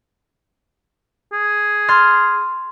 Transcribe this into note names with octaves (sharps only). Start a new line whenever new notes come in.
G#4
C6 F6 A6